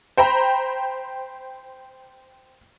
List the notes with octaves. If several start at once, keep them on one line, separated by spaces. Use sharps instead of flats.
C5 G5 A#5 B5